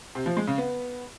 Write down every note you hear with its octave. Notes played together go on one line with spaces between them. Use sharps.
C3
F3
G#3
C#3
B3